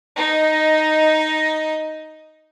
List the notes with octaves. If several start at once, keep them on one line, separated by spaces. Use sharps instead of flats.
D#4 D#5